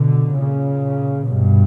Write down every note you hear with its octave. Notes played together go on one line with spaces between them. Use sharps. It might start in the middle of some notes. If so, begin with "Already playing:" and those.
Already playing: B2 D3
A#2 C#3
G2 B2